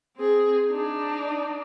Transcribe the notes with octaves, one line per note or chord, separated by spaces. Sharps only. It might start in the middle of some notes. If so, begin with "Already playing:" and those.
C4 G#4
D4 D#4